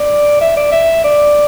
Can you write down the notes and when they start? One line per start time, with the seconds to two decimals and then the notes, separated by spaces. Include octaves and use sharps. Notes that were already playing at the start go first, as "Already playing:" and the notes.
Already playing: D5
0.41 E5
0.57 D5
0.72 E5
1.04 D5